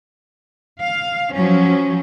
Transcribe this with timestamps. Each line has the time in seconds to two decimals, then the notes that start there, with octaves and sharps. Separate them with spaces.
0.80 F5
1.34 F3 F#3 C#4